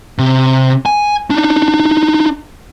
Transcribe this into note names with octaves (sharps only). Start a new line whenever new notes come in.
C3
G#5
D4 D#4